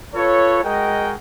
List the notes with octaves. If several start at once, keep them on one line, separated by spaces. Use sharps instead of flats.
F4 A4 B4 C#5
G#3 F#4 G#4 A#4 D#5 G5